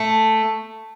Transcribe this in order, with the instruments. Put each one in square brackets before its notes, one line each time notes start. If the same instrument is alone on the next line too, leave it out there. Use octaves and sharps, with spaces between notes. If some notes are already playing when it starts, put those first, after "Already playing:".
Already playing: [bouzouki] A3